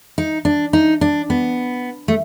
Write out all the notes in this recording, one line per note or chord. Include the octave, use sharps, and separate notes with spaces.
D#4
D4
D#4
D4
B3
A3